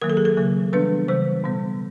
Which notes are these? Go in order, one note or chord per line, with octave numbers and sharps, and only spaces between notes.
D#3 F#3 A#3 A#4
A4
G#4
A4
C#3 F#3 A#3
E3 G3 B3 D4 B4
C#3 E3 G3 C5
B2 G3 B3